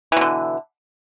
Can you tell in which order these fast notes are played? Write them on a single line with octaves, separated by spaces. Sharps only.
E3 B2 D3